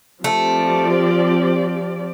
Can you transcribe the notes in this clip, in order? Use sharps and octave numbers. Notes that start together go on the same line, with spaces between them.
F3 A3 C4 G4 D5